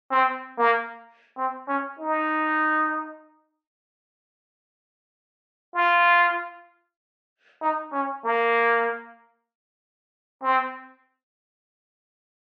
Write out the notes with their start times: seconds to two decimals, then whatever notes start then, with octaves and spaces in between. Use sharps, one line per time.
0.11 C4
0.58 A#3
1.37 C4
1.68 C#4
1.99 D#4
5.74 F4
7.61 D#4
7.93 C#4
8.24 A#3
10.43 C4